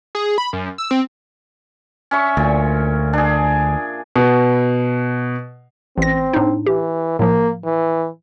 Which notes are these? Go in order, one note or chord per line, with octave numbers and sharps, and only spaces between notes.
G#4
B5
F#2
E6
C4
C#4 E5 C#6
D2 A#2
D4 G#4
B2
A1 C4 A#6
A2 D4 D#4
E3 G4
A2 F3 A#3
E3